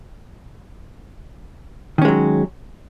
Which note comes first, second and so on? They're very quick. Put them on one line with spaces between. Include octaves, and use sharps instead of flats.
D#3 C#4 G#3 F#3